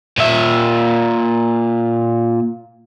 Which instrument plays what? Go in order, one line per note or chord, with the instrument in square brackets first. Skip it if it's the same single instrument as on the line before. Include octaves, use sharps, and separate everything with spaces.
[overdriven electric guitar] A#2 E5